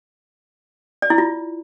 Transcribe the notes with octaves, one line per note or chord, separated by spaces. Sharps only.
D5
E4
F4